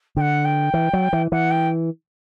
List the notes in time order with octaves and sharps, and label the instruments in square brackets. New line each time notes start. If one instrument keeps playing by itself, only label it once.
[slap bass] D3 [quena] G5
[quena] F#5
G5
[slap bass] E3
F#3
E3
[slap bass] E3 [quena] F#5
[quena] G5